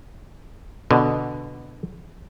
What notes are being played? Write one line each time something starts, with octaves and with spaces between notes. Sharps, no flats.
B2 D3